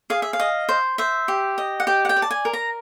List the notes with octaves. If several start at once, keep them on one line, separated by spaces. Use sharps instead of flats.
G#4 F5
E5
F5
D#5
C5
C5 E5
G4
D#5
F#5
G4 G5
F#5
G5
D5
A5
G#5
A#4
A#5